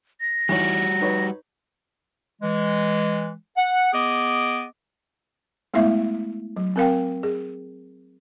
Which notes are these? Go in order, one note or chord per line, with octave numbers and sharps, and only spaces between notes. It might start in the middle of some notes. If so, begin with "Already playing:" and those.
A#6
E2 G3 D#4 F#4 C#5
D#4 B4 C#5
E3 G#3
F#5
B3 G#4 D#5 D6
G#3 A3 B3 E4 E5 F5
F#3
C4 A#4 F5 G5
G#4